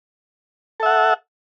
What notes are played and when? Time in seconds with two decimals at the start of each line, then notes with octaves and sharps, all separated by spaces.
0.80 A4
0.83 E5
0.86 F#5